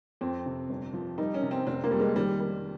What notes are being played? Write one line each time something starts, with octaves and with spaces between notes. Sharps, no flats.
F2 C4
C3
G1
F3
G3 D#4
C#4
C3
C4
F1 C4
A#3
F2 G3
G#3
D#3 G3
G3